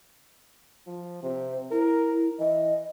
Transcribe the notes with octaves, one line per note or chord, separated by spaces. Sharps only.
F3
C3 C5
E4 A#4
E3 D#5